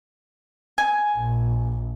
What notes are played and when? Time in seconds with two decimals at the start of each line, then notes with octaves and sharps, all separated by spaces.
0.78 G#5
1.17 A#1